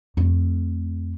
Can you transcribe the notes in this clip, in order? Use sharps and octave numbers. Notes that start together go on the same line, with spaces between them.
F2 A3